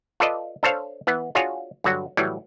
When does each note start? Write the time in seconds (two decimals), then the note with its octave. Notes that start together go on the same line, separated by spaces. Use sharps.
0.20 F4 A4 B4 D5 D#5
0.63 D4 A4 C5 C#5 F5
1.07 E3 B3
1.35 D4 F4 F#4 G#4 C#5
1.84 G2 D3 F#3 F#4
2.17 A2 E3 F#3 G3